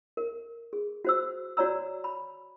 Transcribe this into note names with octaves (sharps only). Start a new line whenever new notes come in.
A#4
G#4
F#4 C5 E6
F#4 C#5 D5 A#5 E6
B5